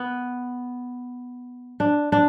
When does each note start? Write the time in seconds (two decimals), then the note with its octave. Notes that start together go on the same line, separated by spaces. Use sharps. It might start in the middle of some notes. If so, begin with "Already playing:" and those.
Already playing: B3
1.80 D4
2.12 D4